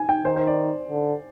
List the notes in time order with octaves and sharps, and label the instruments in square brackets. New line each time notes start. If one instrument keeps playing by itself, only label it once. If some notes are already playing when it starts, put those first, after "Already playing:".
Already playing: [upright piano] G#5
G5
[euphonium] D#3 [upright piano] C5
[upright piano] C5
D5
[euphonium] D3